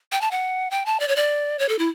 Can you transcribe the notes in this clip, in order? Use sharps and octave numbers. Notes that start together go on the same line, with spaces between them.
G5
A5
F#5
G5
A5
D5
C#5
D5
C#5
A4
E4